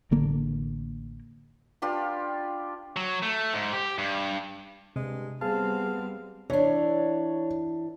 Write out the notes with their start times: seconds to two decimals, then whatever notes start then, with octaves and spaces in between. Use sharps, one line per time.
0.11 A1 D3 A#3
1.82 D4 F4 G4 B4
2.96 F#3
3.23 A3
3.54 G#2
3.73 G4
3.98 G2
4.96 G2 C3 G#3
5.41 G3 B3 C4 G#4 F5 A5
6.50 E3 D4 C#5